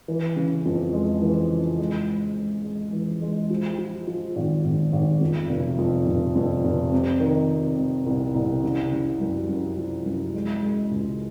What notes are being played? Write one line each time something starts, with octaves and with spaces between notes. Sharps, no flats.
E3
C#3
F2
G#3
E3
C#3
G#3
G#3
G#3
G#3
E3
G#3
F3
F3
F3
G#1
G#1
G#1
F2
F1
F2
F1
F2
F1
C3
D#3
C3
C3
C2
C2
C#3
C#3
F#2
F#2
F3
F#2
G#3
G#3
C#2